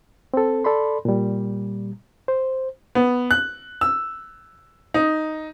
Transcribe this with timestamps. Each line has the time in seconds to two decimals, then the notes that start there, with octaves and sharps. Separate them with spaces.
0.34 C4 A4
0.64 A4 D5 B5 C6
1.05 A#2 G3
2.28 C5
2.95 B3
3.31 F#6
3.81 E6
4.94 D#4